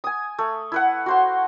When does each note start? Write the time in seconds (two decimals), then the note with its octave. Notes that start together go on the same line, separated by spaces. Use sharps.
0.04 G#5 D#6
0.38 A3
0.72 E4 B4 F#5
1.06 F#4 C5 C6